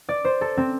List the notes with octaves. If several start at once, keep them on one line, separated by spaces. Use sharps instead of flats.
D5
C5
A4
C4